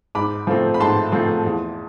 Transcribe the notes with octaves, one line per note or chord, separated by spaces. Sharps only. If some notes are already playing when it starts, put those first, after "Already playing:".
G#2 B5 D6
F3 A3 C4
B5
G#2 A5 C6
F3 A3 C4
E2